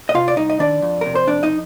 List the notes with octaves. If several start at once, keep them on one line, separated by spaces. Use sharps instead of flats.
D#5
C3 F4 F5
D5
C2 D#4 D#5
D#5
D#3 D4 D5
F2
C3 A#4
C5
F2 D4 D5
D#4 D#5